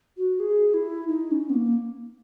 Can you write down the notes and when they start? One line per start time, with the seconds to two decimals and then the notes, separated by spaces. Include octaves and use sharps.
0.17 F#4
0.40 G#4
0.74 E4
1.08 D#4
1.31 C#4
1.50 B3
1.54 A#3